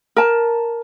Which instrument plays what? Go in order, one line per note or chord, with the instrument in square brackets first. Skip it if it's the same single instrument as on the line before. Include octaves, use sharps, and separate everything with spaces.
[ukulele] A#4 A5